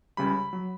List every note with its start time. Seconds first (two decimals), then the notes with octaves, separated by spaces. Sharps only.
0.17 C#2 C#3 G3 B5
0.53 F#3